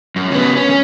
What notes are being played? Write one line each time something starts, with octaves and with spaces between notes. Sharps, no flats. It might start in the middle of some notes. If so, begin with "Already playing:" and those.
F#2
C#3 B3
C#4
C#4